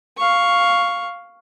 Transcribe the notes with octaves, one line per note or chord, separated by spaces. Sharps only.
F5 C#6